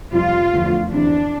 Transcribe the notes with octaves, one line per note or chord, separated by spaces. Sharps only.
F2 C3 G3 F4
E2 D3 F3 A3
E2 C3 E3 D4